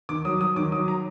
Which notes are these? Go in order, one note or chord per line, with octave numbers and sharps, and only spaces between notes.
D#3 D6
F#3 D#6
F#3 D#6
D#3 D6
F#3 D#6
A#5